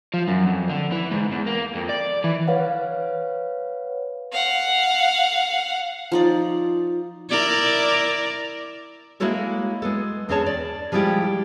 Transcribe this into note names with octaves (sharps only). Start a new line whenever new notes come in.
F3
F#2
F2
D3
E3
G#2
E2
A#3
F2
D5
E3
B4 C#5 F5 F#5
F5 F#5
F3 D#4 D5
E4 A#4 D5
G#3 A#3 E4 F#4 A4 C#5
G#3 B3 A4
E2 C4 C#4 G#4 C#5 A5
D5
F3 G3 G#3 E4 F4 G4